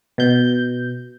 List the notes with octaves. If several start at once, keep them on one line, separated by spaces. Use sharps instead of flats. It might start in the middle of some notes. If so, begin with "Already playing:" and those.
B2 G6